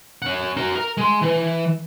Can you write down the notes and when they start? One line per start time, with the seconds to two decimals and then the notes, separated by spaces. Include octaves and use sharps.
0.22 C#4 F#5
0.57 F#4 A#4
0.75 A#4
0.97 G#3 C6
1.22 E3